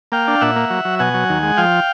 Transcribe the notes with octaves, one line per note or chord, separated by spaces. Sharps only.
A#3 F5 G5
D4
A#2 E5 F#5
A#3
F#3
F#3
B2 F#5 G#5
F#3
D#2
G#3
F3 F5 G5